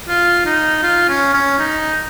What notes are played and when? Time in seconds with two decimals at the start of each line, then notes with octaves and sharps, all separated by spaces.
0.09 F4
0.46 D#4
0.83 F4
1.09 C#4
1.34 C#4
1.59 D#4